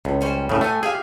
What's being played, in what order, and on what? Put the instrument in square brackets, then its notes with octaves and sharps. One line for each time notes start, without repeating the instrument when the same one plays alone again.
[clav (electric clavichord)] C#2 [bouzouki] A2
[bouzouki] G3 C#4 C5
[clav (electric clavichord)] A2 C#3 [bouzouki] G#4
[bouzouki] A2 G4 G#5 [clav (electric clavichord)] A3
[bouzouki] G4 E5 F5 [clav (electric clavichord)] G#4 G#5